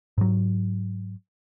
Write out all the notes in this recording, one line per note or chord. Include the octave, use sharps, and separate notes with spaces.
G#2 F#3